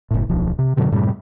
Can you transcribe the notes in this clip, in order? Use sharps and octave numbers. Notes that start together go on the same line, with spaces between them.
F#1 A2
D1 B1 F3
C3
F#2 B2 D3 F#3
F#2 A2 C3 G3